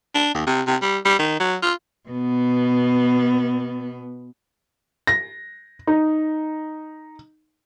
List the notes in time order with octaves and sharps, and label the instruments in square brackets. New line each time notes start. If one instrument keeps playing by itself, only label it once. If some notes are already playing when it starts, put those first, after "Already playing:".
[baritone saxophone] D4
D#2
C3
C3
G3
G3
D#3
F#3
F4
[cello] B2 B3
[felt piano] A#6
D#4